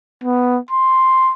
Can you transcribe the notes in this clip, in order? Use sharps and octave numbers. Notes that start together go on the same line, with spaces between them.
B3
C6